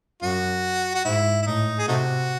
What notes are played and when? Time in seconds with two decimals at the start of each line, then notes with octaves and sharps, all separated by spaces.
0.23 F#2 F#4
0.95 F#4
1.05 G#2 E4
1.42 E4
1.46 A2 D#4
1.79 G#4
1.87 C3 A3 D#4 F#4